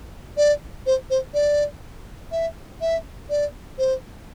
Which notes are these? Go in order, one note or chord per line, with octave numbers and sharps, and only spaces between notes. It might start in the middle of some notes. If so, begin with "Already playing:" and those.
D5
C5
C5
D5
E5
E5
D5
C5